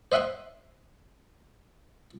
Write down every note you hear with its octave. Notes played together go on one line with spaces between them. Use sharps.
C5 D#5 E5 F#5 G5 C6